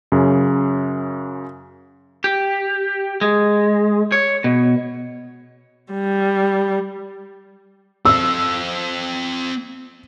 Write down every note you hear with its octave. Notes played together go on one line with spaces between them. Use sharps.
F#2 C#3
G4
G#3
C#5
B2
G3
C4 A4 E6